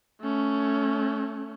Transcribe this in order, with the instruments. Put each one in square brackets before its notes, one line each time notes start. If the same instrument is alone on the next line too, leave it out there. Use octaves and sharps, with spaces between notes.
[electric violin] A3 C#4